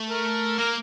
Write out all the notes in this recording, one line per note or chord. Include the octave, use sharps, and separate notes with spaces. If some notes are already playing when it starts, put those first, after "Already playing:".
Already playing: A3
A#4
A#3 A#4